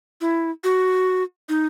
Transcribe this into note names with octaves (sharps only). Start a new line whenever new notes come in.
E4
F#4
D#4